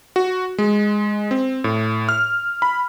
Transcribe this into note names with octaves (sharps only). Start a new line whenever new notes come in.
F#4
G#3
C4
A2
F6
B5